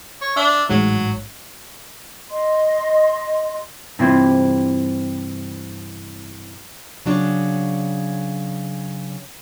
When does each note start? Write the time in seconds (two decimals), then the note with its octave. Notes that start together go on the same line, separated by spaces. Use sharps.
0.21 C#5
0.36 D4 E5
0.70 A1 G#2 F#3
2.31 D#5 C6
3.99 G2 C3 E3 C4 E4 F4
7.06 C#3 F#3 D4